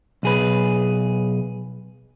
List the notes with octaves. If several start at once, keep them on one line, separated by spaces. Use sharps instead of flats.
B1 G#4 B4